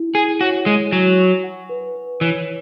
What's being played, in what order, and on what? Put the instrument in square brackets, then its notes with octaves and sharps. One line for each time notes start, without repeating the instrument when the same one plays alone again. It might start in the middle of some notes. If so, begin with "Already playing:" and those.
Already playing: [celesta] E4
[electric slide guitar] G#4 [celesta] G#5
[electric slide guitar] F#4 [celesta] C#5
[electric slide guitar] G#3 [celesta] C#5
[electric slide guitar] F#3 [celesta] G#5
[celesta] C#6
F#5
B4
B4
[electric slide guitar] E3 [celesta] C#5